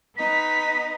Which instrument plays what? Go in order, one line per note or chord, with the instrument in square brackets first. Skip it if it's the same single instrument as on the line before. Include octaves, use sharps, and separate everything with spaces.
[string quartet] B3 D#4 D#5 [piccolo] B6